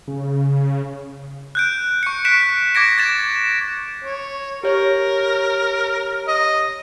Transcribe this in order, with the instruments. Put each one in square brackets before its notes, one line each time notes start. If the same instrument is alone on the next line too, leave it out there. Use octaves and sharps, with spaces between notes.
[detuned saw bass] C#3
[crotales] F#6 G6 D7
C#6 C#7
F#6 B6 D7 E7
D6 G#6 A#6 D7
G#6 A6 E7
[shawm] C#5
[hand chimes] G4 C#5 [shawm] A#4
[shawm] D#5